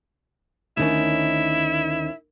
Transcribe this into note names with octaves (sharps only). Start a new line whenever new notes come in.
D2 D#3 C#4 E4